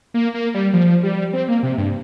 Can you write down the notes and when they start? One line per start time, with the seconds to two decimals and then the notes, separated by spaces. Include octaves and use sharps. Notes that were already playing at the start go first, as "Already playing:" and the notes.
0.14 A#3
0.34 A#3
0.54 G3
0.73 F3
1.03 G3
1.33 C4
1.48 A#3
1.63 C3
1.78 G2